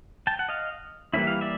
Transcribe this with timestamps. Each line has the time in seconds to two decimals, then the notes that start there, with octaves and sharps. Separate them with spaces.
0.27 G5 A5
0.39 F#5
0.49 D#5 F5
1.13 E3 G3 A#3 C#4 E4 E5
1.27 F5
1.41 D5 E5